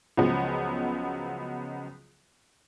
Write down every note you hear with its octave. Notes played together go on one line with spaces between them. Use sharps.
C#2 F3 F#3 G#3 B3